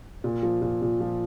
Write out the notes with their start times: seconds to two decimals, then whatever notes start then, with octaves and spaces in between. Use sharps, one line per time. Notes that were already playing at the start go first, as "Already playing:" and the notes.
0.24 A#2
0.43 F3
0.62 A#2
0.82 A#2
1.00 F3